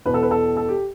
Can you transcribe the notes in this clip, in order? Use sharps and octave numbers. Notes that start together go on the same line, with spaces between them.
E2 B2 B4
A4
B4
A4
A4
G4